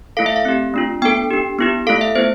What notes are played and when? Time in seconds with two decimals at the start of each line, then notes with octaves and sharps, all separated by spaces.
0.17 A3 E4 A4 F5
0.26 E5
0.36 F5
0.45 C4 G4
0.74 A3 D4 F4
1.02 B3 D4 A4 G5
1.31 D4 G4
1.59 B3 E4 G4
1.87 A3 E4 A4 F5
2.01 E5
2.15 B3 E4 C5